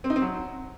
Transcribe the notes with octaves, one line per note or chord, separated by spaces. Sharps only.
C4
D#4
C4
F#3